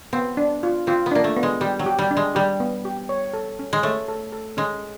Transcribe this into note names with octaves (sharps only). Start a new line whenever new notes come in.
B3 C4
D4
F4
C4 F4
B3
A#3 D4
A3
B3
G#3
G3 G4
F#3
G4
G3
D4
G#3
G3 G4
B3
G4
C#5
A4
C#4
G#3
A3 C#5
A4
A4
G#3 C#4